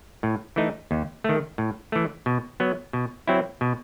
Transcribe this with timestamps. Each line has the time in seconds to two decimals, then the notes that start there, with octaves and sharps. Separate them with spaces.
0.23 A2
0.56 E3 A3 D#4
0.91 D#2
1.24 D#3 A3
1.58 A2
1.92 E3 A3
2.26 B2
2.60 F#3 B3
2.93 B2
3.27 F#3 C4 E4
3.61 B2